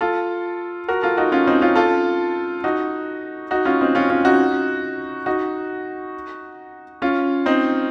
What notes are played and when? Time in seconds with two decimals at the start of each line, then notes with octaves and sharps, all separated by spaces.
0.01 F4 A4
0.88 F#4 A#4
1.02 F4 A4
1.17 D#4 F#4
1.32 C#4 F4
1.47 C4 D#4
1.62 C#4 F4
1.76 F4 A4
2.64 D#4 F#4
3.51 D#4 F#4
3.65 C#4 F4
3.81 C4 D#4
3.95 C#4 F4
4.10 C#4 F4
4.25 D#4 F#4
5.26 D#4 F#4
7.02 C#4 F4
7.46 C4 D#4